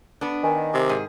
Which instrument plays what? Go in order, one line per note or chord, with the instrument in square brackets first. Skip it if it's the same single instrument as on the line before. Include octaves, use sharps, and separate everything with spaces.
[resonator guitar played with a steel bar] B3 D4
[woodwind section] D#3 [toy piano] A#4 G#5
[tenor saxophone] C3 [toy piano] D6
[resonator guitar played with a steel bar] G#2 G#4